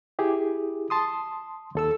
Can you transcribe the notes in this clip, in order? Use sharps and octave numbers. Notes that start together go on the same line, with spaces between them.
E4 G4 G#4
A5 C6 D#6
D#2 A4 E6